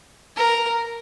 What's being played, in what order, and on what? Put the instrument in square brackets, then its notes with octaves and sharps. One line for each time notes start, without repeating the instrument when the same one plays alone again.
[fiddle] A#4